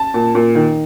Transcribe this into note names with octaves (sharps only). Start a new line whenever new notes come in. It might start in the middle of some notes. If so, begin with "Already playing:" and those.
Already playing: A5
A#2
A#2
D#3